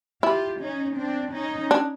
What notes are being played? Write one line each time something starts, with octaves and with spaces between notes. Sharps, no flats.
E4 F4 G4
C#4 D#4
C4 D4
C#4 D#4
D4